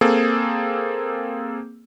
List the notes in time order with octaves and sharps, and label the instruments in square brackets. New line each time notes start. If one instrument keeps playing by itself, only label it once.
[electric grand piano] A#3 C4 G#4 A4